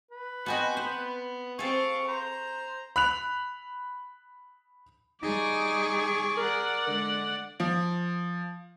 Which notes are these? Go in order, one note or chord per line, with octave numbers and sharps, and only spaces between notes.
B4
B3 C4 F#4 D#5 G#5
B3 C5
C4 G#4 A4 F5 C#6
C5 A#5
B5 F#6 F7
G3 D#4 G#4 C#6 D6
A#4 D5 F#5
D3 G#3
F3